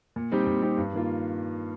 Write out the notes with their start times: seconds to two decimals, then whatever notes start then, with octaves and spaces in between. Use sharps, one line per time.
0.16 A#2
0.32 G3 C4 D#4 G4
0.47 A#2
0.62 G3 C4 D#4 G4
0.77 G2
0.93 D#3 A#3 F4